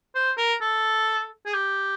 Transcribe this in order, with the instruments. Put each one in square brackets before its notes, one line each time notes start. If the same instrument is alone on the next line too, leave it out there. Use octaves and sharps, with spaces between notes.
[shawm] C5
A#4
A4
G#4
G4